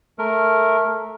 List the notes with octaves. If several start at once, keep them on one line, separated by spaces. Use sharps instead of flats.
A3 A#4